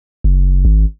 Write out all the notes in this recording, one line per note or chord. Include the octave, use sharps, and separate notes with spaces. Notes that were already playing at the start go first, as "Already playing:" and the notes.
F#1
G#1